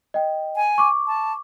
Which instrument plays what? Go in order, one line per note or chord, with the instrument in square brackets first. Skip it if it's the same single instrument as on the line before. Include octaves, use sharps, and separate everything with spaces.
[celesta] D#5 G5
[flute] G#5
[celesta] C#6 D6
[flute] A5